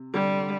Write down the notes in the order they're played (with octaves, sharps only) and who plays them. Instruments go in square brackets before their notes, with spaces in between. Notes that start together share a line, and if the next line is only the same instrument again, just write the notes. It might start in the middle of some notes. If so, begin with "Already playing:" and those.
Already playing: [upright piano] C3
[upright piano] D3 [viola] G3